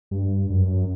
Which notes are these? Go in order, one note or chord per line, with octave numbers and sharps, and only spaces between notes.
G2
F#2